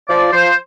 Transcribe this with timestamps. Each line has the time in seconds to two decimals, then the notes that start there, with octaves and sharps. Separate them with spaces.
0.08 F3 D5
0.32 F3 C5